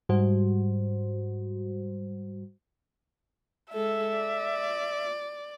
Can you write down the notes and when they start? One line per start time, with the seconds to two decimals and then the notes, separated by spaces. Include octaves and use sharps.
0.09 G#2 G3 F#4 C5
3.73 G#3 A4 E5
4.17 D5